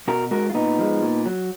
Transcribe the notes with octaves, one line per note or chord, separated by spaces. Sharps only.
B2 F#4 A#4
G#3 F#4 A#4
F4
A#2 B3 D#4
F3 G#3
A#2
F#3